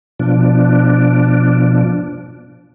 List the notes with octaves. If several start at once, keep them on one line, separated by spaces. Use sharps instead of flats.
B2 F3 D4